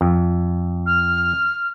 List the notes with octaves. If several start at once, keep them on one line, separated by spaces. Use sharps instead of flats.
F2
F6